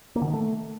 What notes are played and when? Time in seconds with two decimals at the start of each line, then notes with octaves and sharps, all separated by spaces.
0.16 A#3
0.22 D3
0.28 D#3
0.34 A3